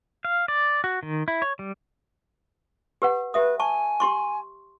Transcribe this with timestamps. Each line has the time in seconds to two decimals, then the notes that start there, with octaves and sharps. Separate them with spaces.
0.25 F5
0.48 D5
0.84 F#4
1.03 D#3
1.28 E4
1.42 C#5
1.59 G3
3.02 G4 B4 F#5
3.34 G4 B4 E5 D#6
3.60 G#5 A5 C#6
4.00 G4 C6 C#6